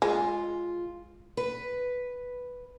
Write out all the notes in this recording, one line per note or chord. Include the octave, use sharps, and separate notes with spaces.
G#3 F4
B4